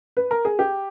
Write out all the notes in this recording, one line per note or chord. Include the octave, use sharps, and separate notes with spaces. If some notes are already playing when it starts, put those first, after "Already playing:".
B4
A#4
G#4
G4